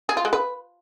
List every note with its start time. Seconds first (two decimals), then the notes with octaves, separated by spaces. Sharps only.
0.09 G#4
0.17 F4
0.25 G#3
0.33 B4